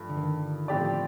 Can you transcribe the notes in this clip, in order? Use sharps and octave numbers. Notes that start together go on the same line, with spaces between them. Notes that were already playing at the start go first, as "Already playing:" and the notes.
Already playing: G2 F3 A3
D3
D#3
A2 F3 C4 G4 D5